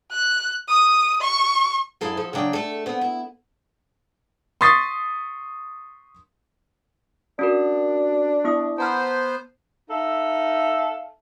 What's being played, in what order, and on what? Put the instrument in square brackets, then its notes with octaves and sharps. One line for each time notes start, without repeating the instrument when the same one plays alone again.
[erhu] F#6
D#6
C#6
[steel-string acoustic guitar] F#2 E4 G#4 A4 F5
F3 A4
C#3 F#3 D4 G5
A3 A4
B3 C4
E4
[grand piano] C6 C#6 D#6 A6 B6 C7
[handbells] C#4 F#4 A#4 [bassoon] D4
[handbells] B3 E4 D#6
[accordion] B3 C5 [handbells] A5 A#5 F6
[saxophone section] D#4 A4 E5 F5